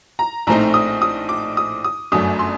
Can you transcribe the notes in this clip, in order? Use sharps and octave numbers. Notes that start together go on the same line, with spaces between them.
A#5
A#1 A2 A3 C4 D#4 A#5
D#6
D#6
D6
D#6
D#6
G1 F#2 F#3 A3 D4 D#6
C6